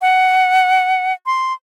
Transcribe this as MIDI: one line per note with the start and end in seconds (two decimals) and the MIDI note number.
0.02 1.13 78
1.26 1.53 84